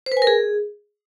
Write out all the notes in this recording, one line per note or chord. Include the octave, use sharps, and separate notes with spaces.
C5
B4
G#5
A#4
G#4